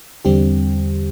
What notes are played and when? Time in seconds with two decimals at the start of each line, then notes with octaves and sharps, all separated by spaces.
0.25 E2 D3 G3 C4 G4